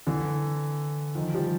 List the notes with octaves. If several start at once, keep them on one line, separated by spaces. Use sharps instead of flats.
D3 E3
D#3 F3
F3 G3